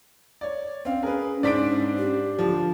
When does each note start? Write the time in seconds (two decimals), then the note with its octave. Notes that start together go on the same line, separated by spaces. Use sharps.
0.41 C#5 D5
0.85 C4 C#4 F5
1.03 G#4 A#4 B4
1.43 G#2 C#4 D4 C5 D5 B6 D7
1.98 G4
2.39 D3 F3